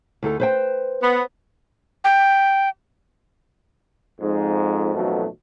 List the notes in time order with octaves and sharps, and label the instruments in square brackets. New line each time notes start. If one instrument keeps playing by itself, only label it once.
[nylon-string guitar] D2 D#4 A4
B4 C5 G5
[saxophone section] B3
[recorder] G5
[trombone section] F2 G#2
A1 F2 B2 D#3 F#3 A3